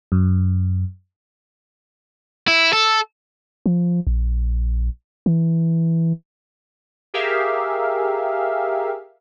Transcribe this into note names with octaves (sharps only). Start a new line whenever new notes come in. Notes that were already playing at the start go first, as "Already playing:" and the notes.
F#2
E4
A4
F3
A#1
E3
G4 G#4 A#4 E5 F5